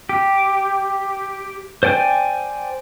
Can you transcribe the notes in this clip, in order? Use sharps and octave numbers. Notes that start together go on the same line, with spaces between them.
G4
C5 D5 G5 G#5